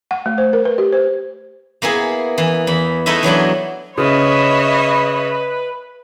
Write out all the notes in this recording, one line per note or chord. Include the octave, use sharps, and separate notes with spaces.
F#5
A3
C5
A#4
B4
G4
C5
A#3 B3 E4 G#4
E3
E2 B5
A3 D#4 E4 B4 D#5 E5
E3 F#3 B3 D4
C#3 B4 C#5 D#5 E5 B5